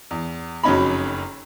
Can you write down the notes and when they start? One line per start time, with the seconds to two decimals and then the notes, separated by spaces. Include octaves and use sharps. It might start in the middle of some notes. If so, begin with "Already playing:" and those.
0.11 E2
0.64 F#1 F2 F#3 C#4 D#4 B5